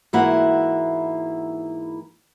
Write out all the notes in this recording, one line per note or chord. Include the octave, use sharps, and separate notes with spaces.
G#2 E3 A#3 E4 F#4 F#5